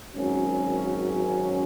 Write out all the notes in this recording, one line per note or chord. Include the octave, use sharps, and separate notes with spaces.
G#1 F#2 F#3 C#4